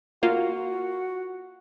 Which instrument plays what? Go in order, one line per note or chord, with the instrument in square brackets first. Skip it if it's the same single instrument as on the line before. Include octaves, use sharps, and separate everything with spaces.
[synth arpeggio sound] A#3 F4 [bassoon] F#4